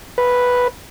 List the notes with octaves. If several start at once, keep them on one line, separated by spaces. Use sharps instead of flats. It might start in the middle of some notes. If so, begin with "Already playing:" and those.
B4